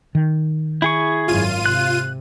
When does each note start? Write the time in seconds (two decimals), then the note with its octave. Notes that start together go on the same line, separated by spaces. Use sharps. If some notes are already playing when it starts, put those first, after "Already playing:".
0.15 D#3
0.82 E4 G#4 C#6
1.28 G#1 F#2 F4 D#7
1.66 C3 F#6